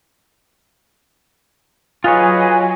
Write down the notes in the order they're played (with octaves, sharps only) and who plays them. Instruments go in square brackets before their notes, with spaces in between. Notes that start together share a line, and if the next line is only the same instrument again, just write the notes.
[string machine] F#3 [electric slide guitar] F4 C#5 [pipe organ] G#4 B4 D#5 [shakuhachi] G#5